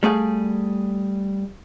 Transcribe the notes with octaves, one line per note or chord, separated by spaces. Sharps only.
G3 A3 G#4 F5